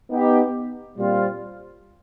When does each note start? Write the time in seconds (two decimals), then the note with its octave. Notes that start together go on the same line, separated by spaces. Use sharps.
0.10 B3 D#4 G4
0.97 A#2 G3 C4 F4